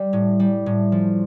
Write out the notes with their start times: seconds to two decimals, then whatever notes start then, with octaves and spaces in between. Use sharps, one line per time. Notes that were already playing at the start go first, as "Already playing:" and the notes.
Already playing: G3
0.13 A2
0.40 G3
0.66 A2
0.92 F3